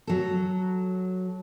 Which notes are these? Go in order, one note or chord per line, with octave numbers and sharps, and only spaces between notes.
F#3 A4